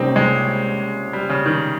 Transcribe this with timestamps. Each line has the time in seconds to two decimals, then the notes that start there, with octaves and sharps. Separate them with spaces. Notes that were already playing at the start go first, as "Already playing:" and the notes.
Already playing: C#2 C3 G3 A#3 C4 C#4 D#4
0.16 G#3
1.13 G3
1.29 C#3
1.46 D#3